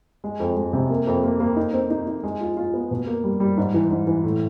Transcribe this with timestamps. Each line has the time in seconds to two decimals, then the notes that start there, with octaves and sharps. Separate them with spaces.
0.24 G#3
0.40 F2
0.56 G#3
0.73 C3
0.90 A#3
1.07 F2
1.24 A#3
1.40 A#3
1.56 D#4
1.73 C4
1.90 D#4
2.07 D#4
2.24 G#3
2.41 F4
2.57 F4
2.74 B3
2.91 B2
3.07 A#3
3.24 G3
3.40 G3
3.57 G#2
3.74 E3
3.91 G#2
4.07 E3
4.23 A2